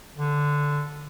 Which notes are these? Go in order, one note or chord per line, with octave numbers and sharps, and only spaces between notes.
D3